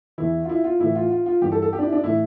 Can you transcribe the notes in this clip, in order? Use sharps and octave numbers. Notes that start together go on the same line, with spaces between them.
E2 E3 E4
F4
E4
F4
A2 E3 E4
F4
F4
F4
G2 E3 G4
A4
A4
G4
D4
E4
D4
A2 E3 E4